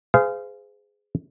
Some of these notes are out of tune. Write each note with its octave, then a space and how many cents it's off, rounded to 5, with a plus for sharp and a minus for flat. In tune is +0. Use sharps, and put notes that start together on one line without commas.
G#4 +0 C5 -40 F5 -15